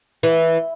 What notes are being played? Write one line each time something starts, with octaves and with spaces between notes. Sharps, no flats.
E3